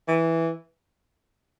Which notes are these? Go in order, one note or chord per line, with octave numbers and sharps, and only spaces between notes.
E3